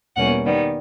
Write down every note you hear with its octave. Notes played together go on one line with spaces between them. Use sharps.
E2 B2 G3 A#3 C#4 F#5
D#3 G3 B3